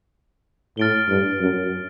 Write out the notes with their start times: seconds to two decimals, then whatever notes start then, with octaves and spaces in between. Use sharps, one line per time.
0.77 A2 F6 A6 D7 G7
1.09 G2
1.40 F#2